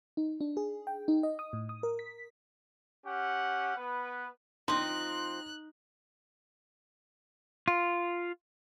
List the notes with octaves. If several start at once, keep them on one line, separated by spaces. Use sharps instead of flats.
D#4
D4
G#4
G5
D#4
D#5
D#6
A2
D#6
A#4
B6
C#4 G4 F#5
B3 B4
F3 C4 D#4 C6 F#6
F4